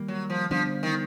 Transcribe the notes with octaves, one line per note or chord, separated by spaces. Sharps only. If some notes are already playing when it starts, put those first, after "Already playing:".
Already playing: D#3 G3 A#3
F#3
F3
D3 F3 G3 B3 D4
D#3